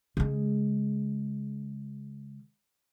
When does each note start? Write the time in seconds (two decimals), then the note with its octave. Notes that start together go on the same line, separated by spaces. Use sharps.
0.17 C#3 G#3